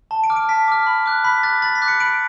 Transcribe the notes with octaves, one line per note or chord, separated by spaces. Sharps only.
A5
D7
D6 F6
D7
A5 B6
D6 F6
B5
D6 F#6
B5 B6
D6 F#6 A6
B5 A6
B6
D6 F#6
C#7
B5 D7